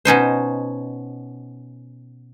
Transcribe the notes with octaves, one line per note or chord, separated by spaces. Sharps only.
B2 C#4 D#4 C5